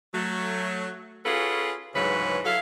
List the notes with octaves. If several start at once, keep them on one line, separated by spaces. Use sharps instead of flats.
F#3 A3
C#4 F4 F#4 G#4 A4 B4
D2 G#2 C#3 E3 F#3 B4
F#3 E4 A4 F5